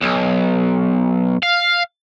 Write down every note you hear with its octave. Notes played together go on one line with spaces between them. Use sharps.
B1
F5